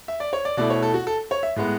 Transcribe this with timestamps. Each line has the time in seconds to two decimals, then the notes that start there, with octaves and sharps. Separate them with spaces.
0.08 E5
0.20 D5
0.33 C#5
0.45 D5
0.57 B2 A3 E4 D5
0.70 C#5
0.83 A4
0.94 F#4
1.07 A4
1.31 C#5
1.43 E5
1.56 A2 G#3 B3